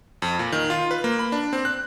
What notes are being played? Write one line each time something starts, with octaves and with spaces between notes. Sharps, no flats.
F2
A#2
D#3
F4
B4
A#3
B5
D4
C4
F#6